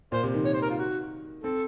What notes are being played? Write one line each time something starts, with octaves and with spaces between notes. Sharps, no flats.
A#2 C5
C3
D#3
D#3 C#5
C5
A#4
F4
F#4
C4 A4